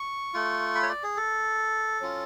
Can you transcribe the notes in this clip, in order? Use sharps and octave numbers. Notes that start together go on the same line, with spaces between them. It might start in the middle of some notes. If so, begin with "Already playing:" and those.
Already playing: C#6
A3 F4
B5
C#5
D5
G#4
A4
F#3 C#4 F4